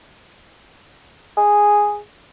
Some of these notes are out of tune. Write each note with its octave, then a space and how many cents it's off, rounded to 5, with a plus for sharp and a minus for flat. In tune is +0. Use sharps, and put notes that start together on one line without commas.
G#4 -5